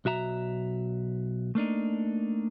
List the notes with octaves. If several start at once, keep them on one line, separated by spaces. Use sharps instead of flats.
B1 F#4 E5 A#5
A3 A#3 D4 D#4